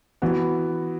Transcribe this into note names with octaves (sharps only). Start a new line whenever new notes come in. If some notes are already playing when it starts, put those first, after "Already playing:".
E3 B3 F#4